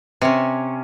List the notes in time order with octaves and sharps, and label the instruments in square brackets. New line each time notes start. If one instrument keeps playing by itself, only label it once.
[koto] C3 C#4